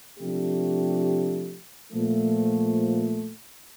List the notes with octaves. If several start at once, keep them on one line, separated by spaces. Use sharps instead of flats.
C3 F3 A3 D4 G4
A#2 F3 A3